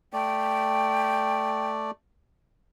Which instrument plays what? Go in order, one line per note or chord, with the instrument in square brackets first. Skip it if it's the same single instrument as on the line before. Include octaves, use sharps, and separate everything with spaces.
[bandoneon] A3 D5 [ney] G5